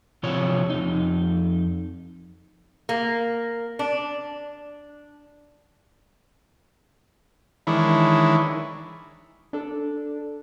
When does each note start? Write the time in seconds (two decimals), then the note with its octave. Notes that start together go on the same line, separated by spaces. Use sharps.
0.23 C3 F3 C4 D4 C#5
0.70 F2 D#4
2.89 A#3
3.79 D4
7.67 D#3 E3 G#3 D4 E4 C#5
9.53 D4 A4